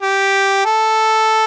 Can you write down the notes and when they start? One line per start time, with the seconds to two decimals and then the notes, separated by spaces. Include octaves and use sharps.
0.02 G4
0.65 A4